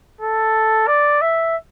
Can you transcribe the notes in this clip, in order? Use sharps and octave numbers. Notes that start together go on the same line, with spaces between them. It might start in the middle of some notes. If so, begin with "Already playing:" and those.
A4
D5
E5